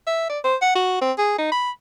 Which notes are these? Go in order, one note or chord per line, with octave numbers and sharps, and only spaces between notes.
E5
D5
C5
F#5
F#4
C4
G#4
D#4
B5